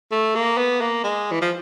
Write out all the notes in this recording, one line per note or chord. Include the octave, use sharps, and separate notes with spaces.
A3
A#3
B3
A#3
G#3
E3
F3